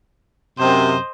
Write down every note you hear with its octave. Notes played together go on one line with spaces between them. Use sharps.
F#2 C3 C5 D#5